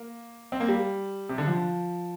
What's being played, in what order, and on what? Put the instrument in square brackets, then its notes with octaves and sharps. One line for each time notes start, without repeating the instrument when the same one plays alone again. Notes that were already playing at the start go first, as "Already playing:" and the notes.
Already playing: [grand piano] A#3
C4
A#3
G3
C3
D3
F3